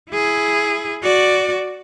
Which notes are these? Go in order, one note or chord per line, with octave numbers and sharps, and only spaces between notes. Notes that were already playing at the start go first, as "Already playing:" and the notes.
E4 G#4
F#4 D5